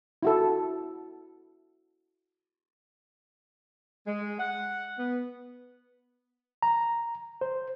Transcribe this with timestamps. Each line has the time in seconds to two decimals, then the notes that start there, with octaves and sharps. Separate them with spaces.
0.23 E4 F#4 A4
4.06 G#3
4.39 F#5
4.97 B3
6.63 A#5
7.41 C5